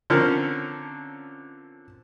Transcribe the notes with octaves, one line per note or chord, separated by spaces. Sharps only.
D3 F3 C4 C#4 A#4